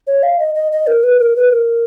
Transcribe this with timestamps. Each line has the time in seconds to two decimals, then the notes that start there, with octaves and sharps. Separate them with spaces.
0.07 C#5
0.23 F5
0.39 D#5
0.55 D#5
0.72 D#5
0.87 A#4
1.03 B4
1.19 A#4
1.36 B4
1.51 A#4